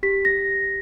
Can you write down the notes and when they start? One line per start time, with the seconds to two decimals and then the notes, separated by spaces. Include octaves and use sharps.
0.03 G4 B6
0.25 A#6